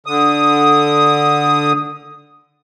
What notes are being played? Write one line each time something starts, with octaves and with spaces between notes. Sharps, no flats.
D3 D#6